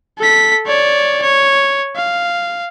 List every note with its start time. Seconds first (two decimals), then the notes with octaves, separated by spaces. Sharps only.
0.19 A4 B6
0.67 C#5 D5
1.22 C#5
1.96 F5